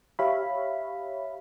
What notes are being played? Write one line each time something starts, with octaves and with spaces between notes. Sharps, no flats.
G4 C#5 E5 F5 B5